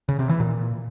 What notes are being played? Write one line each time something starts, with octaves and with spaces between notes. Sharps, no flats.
C#3
C3
E3
A#2